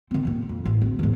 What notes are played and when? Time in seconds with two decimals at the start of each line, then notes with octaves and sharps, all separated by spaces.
0.11 D#3 C4
0.25 D#1 A#2
0.49 F2
0.65 A1
0.82 D1
0.99 E2 A2